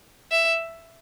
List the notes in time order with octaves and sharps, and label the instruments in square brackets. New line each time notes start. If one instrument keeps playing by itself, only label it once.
[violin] E5